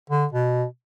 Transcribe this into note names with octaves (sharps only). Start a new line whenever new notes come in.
D3
B2